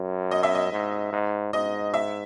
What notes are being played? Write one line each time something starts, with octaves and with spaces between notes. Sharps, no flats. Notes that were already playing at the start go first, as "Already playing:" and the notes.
Already playing: F#2
D#5
E5
D#5
G#2
G#2
G#2 D#5
E5